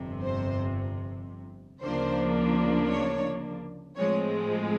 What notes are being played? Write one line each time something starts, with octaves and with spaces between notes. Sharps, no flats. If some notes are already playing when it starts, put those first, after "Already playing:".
Already playing: G1 F2 C3
C5
D2 C#3 F3 A#3 D4 C5
C#5
A2 F3 G#3 C4 C#5